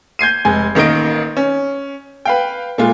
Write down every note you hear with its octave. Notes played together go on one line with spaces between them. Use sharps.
G6 G#6 C7 D#7
F1 G#3 G#5
A1 D#3 A#3 D#5 D7
C#4
B4 F5 G5
A#2 G#3 A3 F4